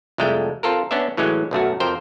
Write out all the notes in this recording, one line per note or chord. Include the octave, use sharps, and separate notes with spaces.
C2 F2 G#3 A3 G5
C4 F4 A4 A#4
B3 C#4 D4 D5 E5
A2 E3 F#3 G#3 C#4
B1 F#2 A3 F#4
F2 A#4 C5 G5